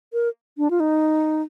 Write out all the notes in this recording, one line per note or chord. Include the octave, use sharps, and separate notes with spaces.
A#4
D4
F4
D#4